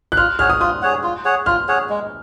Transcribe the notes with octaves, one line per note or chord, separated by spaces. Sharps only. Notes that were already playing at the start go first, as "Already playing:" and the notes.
F#6
F4 F6
G#4 C#5 F#5 F6
D#6
F4 D#6
G#4 C#5 F#5
F4
G#4 C#5 F#5
F4 F6
G#4 C#5 F#5
G#3